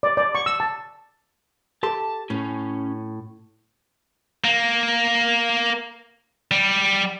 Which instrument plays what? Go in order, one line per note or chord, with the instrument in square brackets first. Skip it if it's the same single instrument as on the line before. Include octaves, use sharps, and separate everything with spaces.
[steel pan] D5
D5
C#6
E6
A5
[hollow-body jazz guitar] G4 A4 C6 [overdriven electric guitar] A5
[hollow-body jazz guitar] A2 [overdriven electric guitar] C#4
[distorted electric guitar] A#3
G3